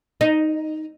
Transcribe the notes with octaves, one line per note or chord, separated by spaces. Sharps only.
D#4